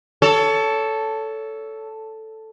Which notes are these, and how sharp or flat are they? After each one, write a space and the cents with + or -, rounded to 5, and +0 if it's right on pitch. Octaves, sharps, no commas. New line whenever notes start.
A4 +0 C#5 +25